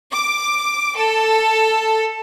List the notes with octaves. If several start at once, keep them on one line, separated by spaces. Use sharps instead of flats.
D6
A4